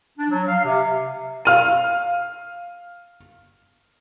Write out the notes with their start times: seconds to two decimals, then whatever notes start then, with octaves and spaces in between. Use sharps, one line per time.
0.18 D4
0.30 F#3
0.48 F5
0.64 C3
1.45 F5 F6 D#7